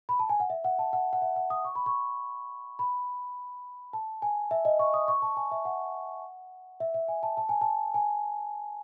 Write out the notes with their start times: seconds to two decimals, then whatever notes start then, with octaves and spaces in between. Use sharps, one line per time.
0.09 B5
0.19 A5
0.29 G#5
0.40 F#5
0.50 E5
0.64 F#5
0.79 A5
0.93 F#5
1.13 F#5
1.22 E5
1.36 F#5
1.50 D#6
1.65 C#6
1.75 B5
1.86 C#6
2.79 B5
3.93 A5
4.22 G#5
4.51 E5
4.65 D#5
4.79 C#6
4.94 D#6
5.08 C#6
5.22 A5
5.37 G#5
5.51 E5
5.65 F#5
6.80 E5
6.94 E5
7.08 G#5
7.23 A5
7.37 A5
7.49 G#5
7.61 A5
7.94 G#5